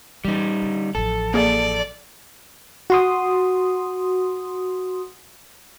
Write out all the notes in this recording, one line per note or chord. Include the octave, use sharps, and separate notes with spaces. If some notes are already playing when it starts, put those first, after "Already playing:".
E3 G3 D#4
D3
A1 F3 A4
A#3 G#4 D5
F#4 C6 D#6